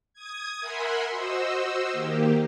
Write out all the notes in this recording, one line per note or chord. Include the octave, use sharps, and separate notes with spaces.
D#6 G#6
A#4 E5 F#5 G#5 B5 C6
F#4 C5 D#5 E6
D#3 A#3 G4